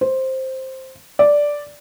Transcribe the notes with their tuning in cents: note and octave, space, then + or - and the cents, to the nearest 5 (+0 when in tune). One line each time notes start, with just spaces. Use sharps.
C5 +5
D5 -5